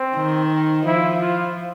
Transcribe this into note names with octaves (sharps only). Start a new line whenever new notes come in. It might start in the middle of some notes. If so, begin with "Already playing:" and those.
Already playing: C4
D#3
F3 E4
F4